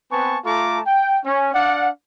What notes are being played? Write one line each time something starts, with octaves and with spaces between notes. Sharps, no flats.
B3 C4 B4 G#5 A5 C#6
A3 F4 A4 A5 A#5 D6
G5
C#4
D4 D5 F5 F#5